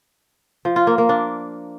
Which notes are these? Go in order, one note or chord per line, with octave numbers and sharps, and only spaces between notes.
F3
F4
A#3
A#3
D4